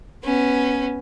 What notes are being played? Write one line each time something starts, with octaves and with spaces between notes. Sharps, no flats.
B3 C#4